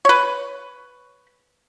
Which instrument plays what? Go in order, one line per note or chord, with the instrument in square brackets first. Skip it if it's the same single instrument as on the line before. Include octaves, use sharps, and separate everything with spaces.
[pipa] B4 C#5